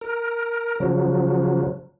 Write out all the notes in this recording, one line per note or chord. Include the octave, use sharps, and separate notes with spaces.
A#4
C#3 F3 F#3